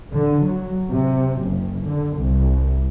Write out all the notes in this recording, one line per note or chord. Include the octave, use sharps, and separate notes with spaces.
D3
F#3
C3
F#1
D3
C2